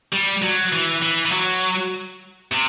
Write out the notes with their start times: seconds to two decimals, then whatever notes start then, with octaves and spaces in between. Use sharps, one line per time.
0.12 G3
0.42 F#3
0.72 E3
1.02 E3
1.25 E3
1.32 F#3
2.52 C3